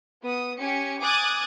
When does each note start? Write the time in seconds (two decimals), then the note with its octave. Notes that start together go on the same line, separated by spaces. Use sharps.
0.24 B3 D#6
0.58 C#4 G4 G#5 C#7
1.01 G#5 D6 D#6 F#6 G#6 A6